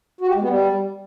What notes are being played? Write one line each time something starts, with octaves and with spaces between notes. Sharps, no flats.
F#4
G4
G#3
B3
G3